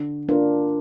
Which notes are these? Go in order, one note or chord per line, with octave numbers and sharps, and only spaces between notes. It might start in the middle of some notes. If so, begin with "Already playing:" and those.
Already playing: D3
A#3 D4 F4 A#4